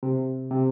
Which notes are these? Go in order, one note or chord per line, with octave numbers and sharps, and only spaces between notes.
C3
C3